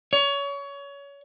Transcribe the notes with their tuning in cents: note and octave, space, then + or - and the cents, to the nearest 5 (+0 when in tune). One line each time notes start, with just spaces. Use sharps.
C#5 +25